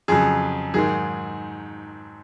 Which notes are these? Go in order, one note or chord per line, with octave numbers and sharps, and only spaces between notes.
F2 C#3 F#3 G#4
G#2 D#3 F#3 G#4